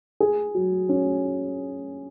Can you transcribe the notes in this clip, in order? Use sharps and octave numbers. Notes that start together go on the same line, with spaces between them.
G#4
F#3
C#4